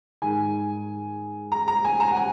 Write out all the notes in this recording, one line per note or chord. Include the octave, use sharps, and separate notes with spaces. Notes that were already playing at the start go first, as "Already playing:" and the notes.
G#2 D#3 G#5
A#5
A#5
G#5
A#5
F#5
G#5